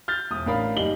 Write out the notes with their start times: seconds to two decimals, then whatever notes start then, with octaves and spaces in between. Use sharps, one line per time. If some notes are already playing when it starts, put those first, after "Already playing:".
0.08 F6 G6 A6
0.31 E1 D#6
0.46 A1 D4 A#4 F5 B5
0.76 F#1 G3 D#4 F#7 G7